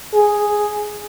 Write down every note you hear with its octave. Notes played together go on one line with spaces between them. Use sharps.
G#4